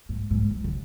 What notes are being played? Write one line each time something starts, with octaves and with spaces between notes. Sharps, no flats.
G#2
G#2
E3
C#3